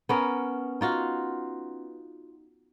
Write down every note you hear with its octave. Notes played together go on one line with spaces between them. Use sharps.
B3 C#4 A#4
D#4 F4 F#4 F5